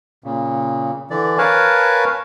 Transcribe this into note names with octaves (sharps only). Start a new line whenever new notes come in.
A#2 C#3
D3 E3 D5
A#4 B4 C#5 F5 G#5 A5